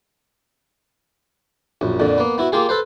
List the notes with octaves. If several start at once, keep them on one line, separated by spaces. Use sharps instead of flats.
A#1 F#2
F2 A#2 D3
A#3 B3
B3 E4 F#4
A#3 F4 G4 G#4
A4 B4 C5